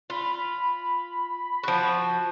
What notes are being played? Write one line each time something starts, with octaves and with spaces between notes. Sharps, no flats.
F4 B5
F3 F#4